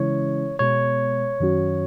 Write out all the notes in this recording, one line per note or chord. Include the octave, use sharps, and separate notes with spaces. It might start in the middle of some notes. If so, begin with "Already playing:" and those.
Already playing: C#3 E3 G#3 C#4 E4 C#5
B2 G#3 B3 C#5
F#2 D#3 F#3 C#4 F#4